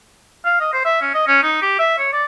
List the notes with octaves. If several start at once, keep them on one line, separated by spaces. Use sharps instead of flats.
F5
D#5
C5
E5
C#4
D#5
C#4
D#4
G4
E5
C#5
D5